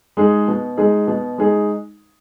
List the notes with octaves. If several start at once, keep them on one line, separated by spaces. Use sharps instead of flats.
G#3 D#4 G#4
B2
G#3 D#4 G#4
B2
G#3 D#4 G#4